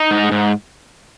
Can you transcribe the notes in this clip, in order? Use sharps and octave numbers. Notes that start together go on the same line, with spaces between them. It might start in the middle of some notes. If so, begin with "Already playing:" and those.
Already playing: D#4
G#2
G#2